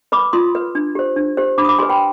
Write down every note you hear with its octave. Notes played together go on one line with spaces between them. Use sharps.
B4 B5 D6
F4 C6 D#6
B4
D4
G4 C5
D4
G4 C5
D4 B5 D6
D#6
B5 D6
G4 B4 G#5 C6
G5 B5